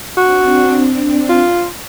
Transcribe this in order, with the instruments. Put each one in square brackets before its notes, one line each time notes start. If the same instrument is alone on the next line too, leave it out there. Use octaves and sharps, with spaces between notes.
[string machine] C4 D4 [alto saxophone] F#4
[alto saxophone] F4